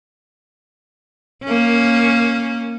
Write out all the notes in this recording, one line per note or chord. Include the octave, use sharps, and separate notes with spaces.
A#3 C#4